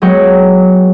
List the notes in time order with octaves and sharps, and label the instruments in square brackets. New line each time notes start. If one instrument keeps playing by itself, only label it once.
[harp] F#3 G#3 B3 G5 C#6